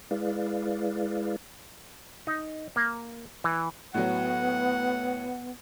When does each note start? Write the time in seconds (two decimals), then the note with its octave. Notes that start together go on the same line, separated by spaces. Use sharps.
0.11 G#3 E4 G#4 B4 D5 F5
2.27 D#4
2.76 A#3
3.44 E3
3.94 A2 F#3 B3 F#5